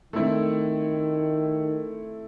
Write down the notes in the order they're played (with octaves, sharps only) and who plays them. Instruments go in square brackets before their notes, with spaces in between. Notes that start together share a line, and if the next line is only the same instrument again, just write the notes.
[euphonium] D#3 [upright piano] A3 C4 E4